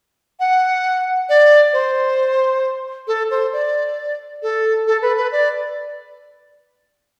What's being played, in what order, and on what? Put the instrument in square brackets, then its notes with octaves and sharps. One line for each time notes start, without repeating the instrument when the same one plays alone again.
[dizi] F#5
D5
C5
A4
C5
D5
A4
A4
B4
B4
D5